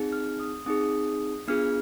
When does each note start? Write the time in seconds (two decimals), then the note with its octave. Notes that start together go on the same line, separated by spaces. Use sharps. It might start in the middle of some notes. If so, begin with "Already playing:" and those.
Already playing: C4 D#4 G#4
0.12 F6
0.40 D#6
0.66 C4 D#4 G#4 D#6
1.48 B3 D4 F4 G#4 F6